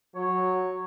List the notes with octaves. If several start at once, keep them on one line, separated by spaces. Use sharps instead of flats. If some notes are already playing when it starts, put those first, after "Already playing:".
F#3 C#5